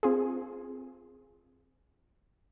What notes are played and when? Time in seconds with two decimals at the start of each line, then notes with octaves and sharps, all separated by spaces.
0.03 C4 F4 G#4